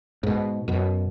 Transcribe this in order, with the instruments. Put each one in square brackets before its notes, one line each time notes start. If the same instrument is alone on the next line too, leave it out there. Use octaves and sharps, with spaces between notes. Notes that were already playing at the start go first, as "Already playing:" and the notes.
[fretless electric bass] G#2 B2
F#2 B2